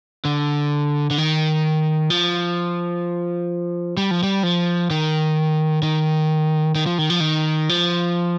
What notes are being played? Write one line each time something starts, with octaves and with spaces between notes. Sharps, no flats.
D3
D3
D#3
F3
G3
F3
G3
F3
D#3
D#3
D#3
F3
D#3
F3
D#3
F3